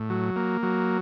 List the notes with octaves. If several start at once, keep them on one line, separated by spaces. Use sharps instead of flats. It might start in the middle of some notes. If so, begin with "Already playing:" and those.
Already playing: A2
F#3
A#3
F#3